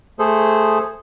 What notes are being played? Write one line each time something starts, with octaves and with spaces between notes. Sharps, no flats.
A3 G#4 A4 C5